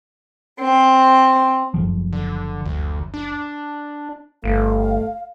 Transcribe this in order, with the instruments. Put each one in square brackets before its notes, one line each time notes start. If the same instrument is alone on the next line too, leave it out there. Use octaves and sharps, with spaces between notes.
[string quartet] C4
[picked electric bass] F#1 C#2 F3
[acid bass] D3
D2
D4
[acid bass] G1 [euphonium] A3 [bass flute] F5